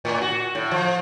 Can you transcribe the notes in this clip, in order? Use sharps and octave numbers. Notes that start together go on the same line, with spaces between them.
A2
F#4
A2
F3